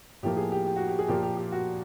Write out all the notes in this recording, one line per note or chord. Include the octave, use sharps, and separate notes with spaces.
A2 F3 A#3 G4
G#4
G4
G4
F#4
G4
G#4
A#2 F3 A#3 G4
G4
G4
F#4